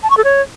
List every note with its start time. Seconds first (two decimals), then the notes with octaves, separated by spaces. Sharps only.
0.03 A5
0.10 C#6
0.17 A4
0.24 C#5